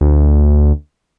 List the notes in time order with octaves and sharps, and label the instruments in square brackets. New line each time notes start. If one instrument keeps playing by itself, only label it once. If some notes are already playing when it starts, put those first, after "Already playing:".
[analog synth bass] D2